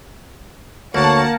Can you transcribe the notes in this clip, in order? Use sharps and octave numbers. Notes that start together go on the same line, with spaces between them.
D2 A#3 C#5 F#5 A5